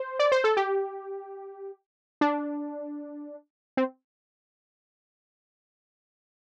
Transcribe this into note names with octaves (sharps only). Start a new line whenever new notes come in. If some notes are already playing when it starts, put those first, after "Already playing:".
Already playing: C5
D5
C5
A4
G4
D4
C4